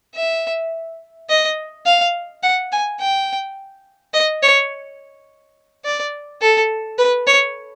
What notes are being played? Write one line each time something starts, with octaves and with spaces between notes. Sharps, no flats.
E5
D#5
F5
F#5
G#5
G5
D#5
C#5
D5
A4
B4
C#5